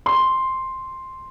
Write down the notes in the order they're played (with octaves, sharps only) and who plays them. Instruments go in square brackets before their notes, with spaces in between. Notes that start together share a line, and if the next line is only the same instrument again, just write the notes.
[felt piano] C6